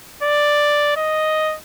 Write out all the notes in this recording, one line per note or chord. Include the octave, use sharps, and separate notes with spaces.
D5
D#5